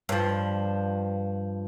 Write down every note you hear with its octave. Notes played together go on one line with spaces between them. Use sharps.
G2 F3